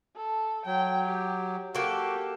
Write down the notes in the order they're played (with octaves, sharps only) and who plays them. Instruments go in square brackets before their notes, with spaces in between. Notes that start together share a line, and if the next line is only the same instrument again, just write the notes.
[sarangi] A4
[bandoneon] F#3 [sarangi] G5
[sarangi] G4
[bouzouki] A#3 A4 [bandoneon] F#4 [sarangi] G4